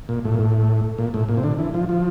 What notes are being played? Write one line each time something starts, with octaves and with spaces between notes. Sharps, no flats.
A#2
A2
A#2
A2
A#2
A2
A#2
C3
D3
E3
F3
F3